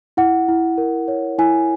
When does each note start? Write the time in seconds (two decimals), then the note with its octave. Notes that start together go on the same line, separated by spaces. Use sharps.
0.17 E4 F#5
0.48 E4
0.78 A#4
1.08 C#5
1.38 E4 G#5